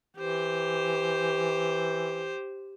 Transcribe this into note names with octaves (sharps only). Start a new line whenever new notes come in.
E3 G4 C5